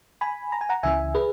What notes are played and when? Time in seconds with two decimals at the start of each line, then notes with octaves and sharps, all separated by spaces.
0.21 G#5 B5
0.52 A#5
0.61 G#5
0.69 F#5 A#5
0.83 C#2 C#3 E3 E5 G#5
1.15 G#4 B4